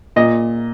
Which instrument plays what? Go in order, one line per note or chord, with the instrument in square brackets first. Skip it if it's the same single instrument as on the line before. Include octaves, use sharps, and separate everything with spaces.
[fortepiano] A#2 D#5